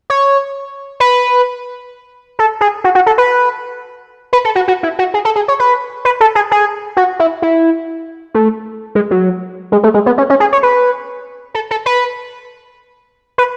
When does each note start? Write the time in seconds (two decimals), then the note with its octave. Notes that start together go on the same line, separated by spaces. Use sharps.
0.10 C#5
1.00 B4
2.39 A4
2.61 G#4
2.84 F#4
2.95 F#4
3.06 A4
3.18 B4
4.33 B4
4.45 A4
4.55 F#4
4.68 F#4
4.83 E4
4.99 F#4
5.14 G#4
5.25 A4
5.36 G#4
5.48 C#5
5.59 B4
6.05 B4
6.21 A4
6.35 G#4
6.51 G#4
6.97 F#4
7.19 E4
7.42 E4
8.34 A3
8.95 G#3
9.11 F#3
9.72 G#3
9.83 A3
9.94 G#3
10.06 B3
10.18 C#4
10.30 C#4
10.40 G#4
10.53 C#5
10.63 B4
11.54 A4
11.71 A4
11.86 B4
13.38 B4